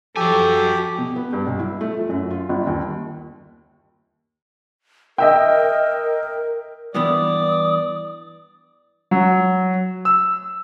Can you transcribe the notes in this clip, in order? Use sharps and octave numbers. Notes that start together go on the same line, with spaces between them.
F3 F#4 G4 A4 G#5
B2
B3
G2
B1
E4
A3
F3
F#2
F4
G1
D#2
A#4 D#5 E5 G5
G2 E3 B3 D5 D#6
F#3
E6